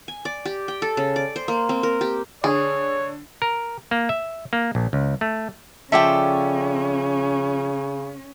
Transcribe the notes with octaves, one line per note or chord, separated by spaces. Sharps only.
G#5
D5
G4
G5
A4
C#3
D5
C5
A#3
C4
A#4
G4
D3 G#4 C#5
A#4
A#3
E5
A#3
A#1
C#2
A3
C#3 F3 C#4 A4 D5 E5 G5